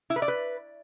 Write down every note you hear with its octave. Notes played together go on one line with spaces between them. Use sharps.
E4
B4
D5
B4